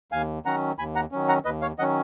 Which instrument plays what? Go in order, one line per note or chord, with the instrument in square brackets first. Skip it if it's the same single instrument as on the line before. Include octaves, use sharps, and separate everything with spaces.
[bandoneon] D#2 F5 G#5
D#3 F#3 C#4 F#5 A#5
D#2 G#5 B5
F#5 A#5
D#3 F#3 C#4
F#5 A#5
D#2 B4 D#5
C#5 F5
D#3 F#3 C#4 D#5 F#5